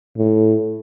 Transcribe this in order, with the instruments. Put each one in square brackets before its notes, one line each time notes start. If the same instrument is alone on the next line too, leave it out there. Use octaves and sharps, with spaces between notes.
[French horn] A2